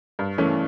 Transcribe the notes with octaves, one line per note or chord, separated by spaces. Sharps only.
G2
E3 A3 C#4